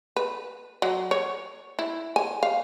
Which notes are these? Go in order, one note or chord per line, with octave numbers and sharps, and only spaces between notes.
B4
F#3
C#5
E4
G#5
F5